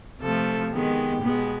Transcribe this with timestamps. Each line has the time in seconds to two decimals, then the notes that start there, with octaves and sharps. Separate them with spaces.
0.21 C3 F3 A3 A4
0.71 D#3 G#3 B3 G4
1.22 B2 G#3 B3